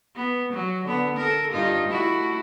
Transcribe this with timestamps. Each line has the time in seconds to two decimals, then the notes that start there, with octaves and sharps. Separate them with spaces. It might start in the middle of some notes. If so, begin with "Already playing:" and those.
0.16 B3
0.53 F#3
0.86 D3 B3
1.17 A4 A#4
1.51 G2 D#4 F4
1.89 A3 E4 F#4